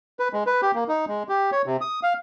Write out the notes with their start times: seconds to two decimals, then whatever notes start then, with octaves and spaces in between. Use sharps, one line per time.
0.20 B4
0.33 G#3
0.47 B4
0.62 G4
0.75 A#3
0.88 D#4
1.08 G#3
1.29 G4
1.52 C#5
1.66 C3
1.81 D#6
2.03 F5